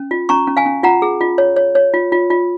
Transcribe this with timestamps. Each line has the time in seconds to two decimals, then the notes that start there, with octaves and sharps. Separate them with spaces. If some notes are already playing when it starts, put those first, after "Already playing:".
Already playing: C#4
0.11 F4
0.29 C#4 A#5 C#6
0.47 C#4
0.57 F5 G#5
0.66 C#4
0.83 F4 F#5 A#5
1.02 G#4
1.21 F4
1.38 C#5
1.56 C#5
1.75 C#5
1.94 F4
2.12 F4
2.30 F4